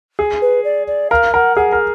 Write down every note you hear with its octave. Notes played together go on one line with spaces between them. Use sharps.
G#4
B4
D5
D5
A#4 F5
A#4 F#5
G#4 F#5
A#4